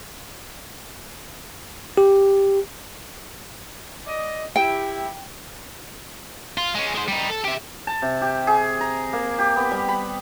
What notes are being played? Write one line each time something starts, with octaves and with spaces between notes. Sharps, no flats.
G4
D5 D#5
E4 G4 G5
F4
G#3 C#4
G#3 C5
G3 D#4
A4
G4 E5
A5
C3
G4
G#4
A#5
A#3
G4
B3
G3
B5